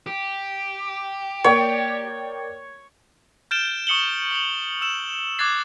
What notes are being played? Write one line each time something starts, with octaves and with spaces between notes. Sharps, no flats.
G4
A#3 C#5 D5 G5
F6 G6 A6 D7 E7 G7
C#6 D#6 C#7 F#7 G7
D#6 F#7
E6 E7 F#7
D6 F#6 G#6 A6 C7